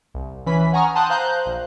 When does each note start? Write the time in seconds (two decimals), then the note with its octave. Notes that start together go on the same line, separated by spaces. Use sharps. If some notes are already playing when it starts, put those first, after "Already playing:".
0.14 C2
0.46 E3 C#4 B4 B5 B6
0.73 F#5 G#5 A#5 C#6 D#6 F6
0.95 G5 A5 C6 D#6 F#6 G6
1.09 C5 F5 A#5 F#6 G6
1.46 A#1